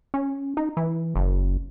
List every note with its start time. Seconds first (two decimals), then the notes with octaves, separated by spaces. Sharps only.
0.14 C#4
0.57 D#4
0.77 E3
1.16 F#1